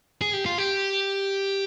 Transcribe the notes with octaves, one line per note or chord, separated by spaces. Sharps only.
G#4
G4
F4
G4